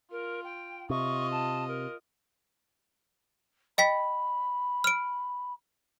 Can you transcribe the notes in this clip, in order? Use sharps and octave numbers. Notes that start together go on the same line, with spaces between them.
F4 A#4
G5
C3 F4 D#5 C#6
A5
A#4
D#5 G5 B5 B6
F6 D7